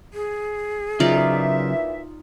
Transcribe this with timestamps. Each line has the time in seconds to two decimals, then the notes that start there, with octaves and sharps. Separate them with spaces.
0.14 G#4
1.00 A#2 C#3 E3 F#3 D#4 F4 D5 E5